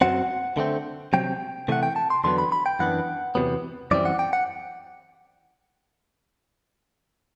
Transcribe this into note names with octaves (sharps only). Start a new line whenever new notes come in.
F#2 F#3 C4 F#5
D3 A3 C4
C3 F#3 C4 G5
C3 E3 A3 F#5
G5
A5
C6
E2 D3 F#3 B3 C6
B5
B5
G5
F#2 E3 B3 D4 F#5
E2 C3 F#3 B3
F#2 E3 G3 C4 D5
F#5
G5
F#5